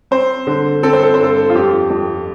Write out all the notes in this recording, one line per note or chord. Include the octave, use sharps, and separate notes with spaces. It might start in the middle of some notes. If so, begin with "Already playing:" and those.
C4 C5
D3
C4 A4
C5
A4
C5
G2 A4
F4
F2 G4
F2